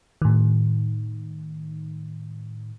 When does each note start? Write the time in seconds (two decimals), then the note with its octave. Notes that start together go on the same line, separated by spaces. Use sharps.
0.22 A2 D#3